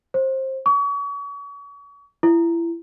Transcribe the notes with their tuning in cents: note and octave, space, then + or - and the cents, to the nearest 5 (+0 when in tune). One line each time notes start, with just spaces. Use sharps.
C5 +20
C#6 +40
E4 +30